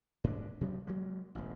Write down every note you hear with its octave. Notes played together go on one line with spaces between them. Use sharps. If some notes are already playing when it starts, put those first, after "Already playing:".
G#2 D4
C3 F#3 G3
F#3 G#3 A#3
E1 A1